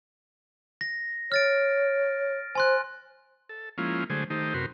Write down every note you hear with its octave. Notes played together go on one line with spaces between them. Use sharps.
A#6
C#5 F6 A6 D7
C5 G#5 C6 F#6
A4
F3 G#3 A#3 C#4 E4 F4
D3 F#3 G#3 A3 G#4 C5
D#3 A3 D#4 G4 C5
F#2 C3 F#4 A#4 B4 C6